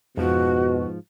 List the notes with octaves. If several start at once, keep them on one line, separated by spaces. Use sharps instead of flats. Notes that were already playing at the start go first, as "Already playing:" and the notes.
F2 G#2 B2 F3 F#4